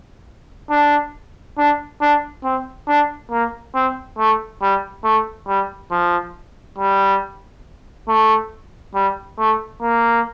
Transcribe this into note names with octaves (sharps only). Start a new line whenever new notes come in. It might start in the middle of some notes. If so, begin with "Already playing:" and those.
D4
D4
D4
C4
D4
A#3
C4
A3
G3
A3
G3
F3
G3
A3
G3
A3
A#3